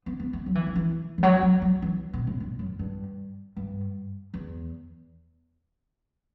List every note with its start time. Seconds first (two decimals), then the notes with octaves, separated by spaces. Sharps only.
0.06 B3
0.19 B3
0.33 A3
0.46 F#3
0.55 E3
0.67 D#3
0.76 E3
1.18 E3
1.23 F#3
1.42 F#3
1.62 F#3
1.82 E3
2.13 B2
2.27 A2
2.40 G2
2.59 F#2
2.79 G2
3.56 G2
4.34 E2